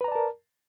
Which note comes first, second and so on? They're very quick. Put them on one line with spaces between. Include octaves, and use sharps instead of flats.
B4 A#5 D5 A5 A#4